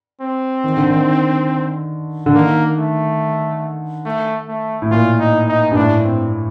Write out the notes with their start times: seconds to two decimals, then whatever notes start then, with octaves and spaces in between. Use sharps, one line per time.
0.21 C4
0.64 D#3
0.77 D3
0.90 D#3
2.26 D3
2.35 D#3 A#3
2.78 A3
4.06 A3
4.48 A3
4.82 A2
4.91 A#2 F4
5.20 D#4
5.48 D#4
5.72 G2
5.76 A2 D4
6.05 C4